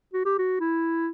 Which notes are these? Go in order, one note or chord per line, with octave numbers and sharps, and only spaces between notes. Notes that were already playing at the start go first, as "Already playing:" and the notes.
F#4
G4
F#4
E4